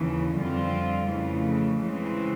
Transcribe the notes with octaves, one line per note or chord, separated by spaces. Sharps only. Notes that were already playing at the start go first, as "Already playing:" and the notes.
Already playing: D#2 C#3 E3
F2 D3 G3 C4 F4
F2 C#3 E3 A3
C#3 E3 G#3 C4